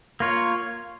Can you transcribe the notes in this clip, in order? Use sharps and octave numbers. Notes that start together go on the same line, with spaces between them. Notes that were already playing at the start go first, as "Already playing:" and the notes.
A#3 F4 C#5